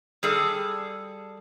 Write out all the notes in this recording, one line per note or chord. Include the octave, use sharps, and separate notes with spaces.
G3 G#4 A4